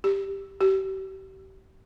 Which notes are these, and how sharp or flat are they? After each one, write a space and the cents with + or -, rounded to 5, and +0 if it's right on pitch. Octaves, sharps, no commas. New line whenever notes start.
G4 +5
G4 -35